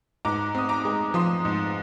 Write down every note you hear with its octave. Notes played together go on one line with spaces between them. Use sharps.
G#2 A#5 D6
C4 D#6
A#5 D6
G#3
F3 C6 D#6
G#2